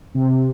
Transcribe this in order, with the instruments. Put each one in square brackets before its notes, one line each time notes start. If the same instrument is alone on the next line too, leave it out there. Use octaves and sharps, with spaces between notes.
[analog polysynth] C3